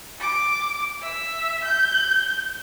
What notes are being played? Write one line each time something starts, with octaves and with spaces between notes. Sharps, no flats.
D6
E5
G6